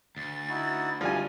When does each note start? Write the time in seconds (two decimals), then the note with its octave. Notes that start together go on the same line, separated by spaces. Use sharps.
0.17 D2 A6
0.50 D#4 E4 F#4
1.01 B2 F3 G3 A3 G#5